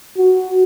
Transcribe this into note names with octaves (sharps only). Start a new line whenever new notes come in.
F#4